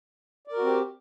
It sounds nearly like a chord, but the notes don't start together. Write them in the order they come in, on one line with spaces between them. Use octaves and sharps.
D5 A#4 F#4 C4 G4